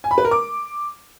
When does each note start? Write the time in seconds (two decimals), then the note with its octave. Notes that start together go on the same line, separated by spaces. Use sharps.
0.04 G#5
0.11 B5
0.18 B4
0.25 A#4
0.31 D6